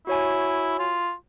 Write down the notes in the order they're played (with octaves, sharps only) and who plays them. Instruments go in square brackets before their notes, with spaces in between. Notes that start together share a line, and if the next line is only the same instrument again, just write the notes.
[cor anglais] E4 [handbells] F#4 C#5 G#5
[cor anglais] F4